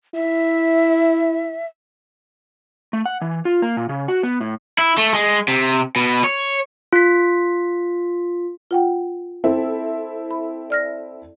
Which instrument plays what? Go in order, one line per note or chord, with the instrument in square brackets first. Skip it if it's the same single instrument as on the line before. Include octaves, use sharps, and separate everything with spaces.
[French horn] E4 [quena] E5
[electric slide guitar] A3
F#5
E3
F4
A#3
A#2
C#3
F#4
B3
A2
[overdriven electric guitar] E4
A3
G#3
C3
B2
C#5
[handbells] F4 B6
[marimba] F4 F#5 G5
[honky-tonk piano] C4 E4 A4
[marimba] B5
D5 F6 A#6